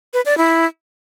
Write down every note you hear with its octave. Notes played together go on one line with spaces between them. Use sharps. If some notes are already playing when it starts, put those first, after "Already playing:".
B4
D5
E4